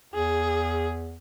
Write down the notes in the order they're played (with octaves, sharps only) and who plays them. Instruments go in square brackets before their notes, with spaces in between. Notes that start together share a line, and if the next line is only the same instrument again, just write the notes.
[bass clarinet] E2 [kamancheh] G#4